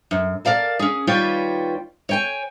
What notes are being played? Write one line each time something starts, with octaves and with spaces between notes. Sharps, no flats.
F#2
A#4 D5 F5 A5
C#4 G#4
D#2 G3 F4 B4 C#5 G5
C#5 G5 G#5